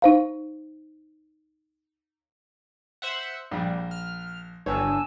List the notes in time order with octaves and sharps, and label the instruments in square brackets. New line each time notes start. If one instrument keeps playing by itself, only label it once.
[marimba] D#4 C5 F5
[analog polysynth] C5 E5 F#5
[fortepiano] A#1 [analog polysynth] G3
[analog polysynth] F6
[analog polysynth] G1 G2 [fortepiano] C#5 [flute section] G#5 A5 E6